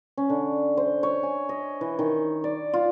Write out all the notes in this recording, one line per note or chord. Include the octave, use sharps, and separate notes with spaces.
C#4
D3
C5
C#5
G#5
D#5
E3
D#3
D5
F4